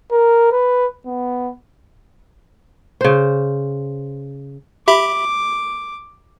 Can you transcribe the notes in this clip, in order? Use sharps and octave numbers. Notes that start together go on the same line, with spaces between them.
A#4
B4
B3
C#3 C5
G4 E5 B5 D6